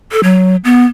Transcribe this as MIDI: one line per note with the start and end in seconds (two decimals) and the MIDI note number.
0.12 0.23 69
0.23 0.56 54
0.64 0.85 59